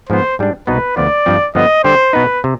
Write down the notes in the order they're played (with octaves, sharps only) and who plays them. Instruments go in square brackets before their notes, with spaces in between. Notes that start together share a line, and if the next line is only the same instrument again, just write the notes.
[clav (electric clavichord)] G#2 F3 B3 [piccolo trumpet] C5
[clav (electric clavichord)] G#2 G3 D4
[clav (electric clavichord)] C2 B2 B3 D#4 [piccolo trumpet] B4
[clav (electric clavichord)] D2 D3 F3 B3 F4 [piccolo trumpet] D5
[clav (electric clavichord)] G2 F3 C4
[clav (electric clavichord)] G2 D3 F3 B3 [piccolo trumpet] D#5
[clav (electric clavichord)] D3 G3 D4 G4 [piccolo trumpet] C5
[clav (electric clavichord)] B2 B3 D#4 [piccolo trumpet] B4
[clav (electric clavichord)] C3